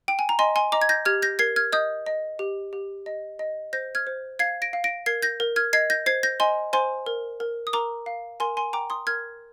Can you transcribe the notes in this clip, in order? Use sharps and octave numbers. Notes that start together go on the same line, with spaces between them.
G5
G#5
A#5
D#5 G#5 C6
G#5 C6
D#5 A#5 D6
G#6
G6 A#6
G4 F6 G#6
G6 A#6
A#4 G#6 C7
F6 G#6
D#5 D#6 G6
D#5
G4
G4
D#5
D#5
C5 G6 A#6
F6 G#6
C5
F5 G#6 C7
A#6 D7
F5
A#6 D7
A#4 G#6 C7
G6 A#6
A#4
F6 G#6
D#5 G#6 C7
G6 A#6
C5 G#6 C7
G6 A#6
D#5 G#5 C6
C5 G#5 C6
A#4
A#4
D#6
A#4 A#5 D6
F5
A#4 G#5 C6
G#5 C6
G5 A#5 D6
C6 D#6
A#4 F6 G#6